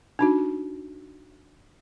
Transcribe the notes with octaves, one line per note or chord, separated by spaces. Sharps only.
D4 D#4 F#4